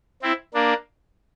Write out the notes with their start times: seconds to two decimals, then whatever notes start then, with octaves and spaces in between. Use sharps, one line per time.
0.22 C4 E4
0.54 A#3 D4